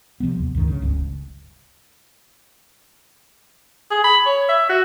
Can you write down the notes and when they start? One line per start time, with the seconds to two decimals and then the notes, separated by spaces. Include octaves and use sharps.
0.20 C3 F3 G#3 B3
0.39 D#2
0.55 C#2 G2 D#3 D4
0.67 C#3
0.82 D1 G1 C#2
3.91 G#4
4.04 B5
4.26 C#5
4.49 E5
4.69 F#4